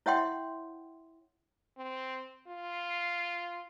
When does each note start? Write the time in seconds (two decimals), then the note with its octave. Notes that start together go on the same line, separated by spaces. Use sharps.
0.06 E4 C#5 E5 F#5 G5 C6
1.77 C4
2.47 F4